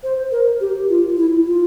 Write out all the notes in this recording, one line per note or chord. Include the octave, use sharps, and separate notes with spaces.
C5
A#4
G4
F4
E4
F4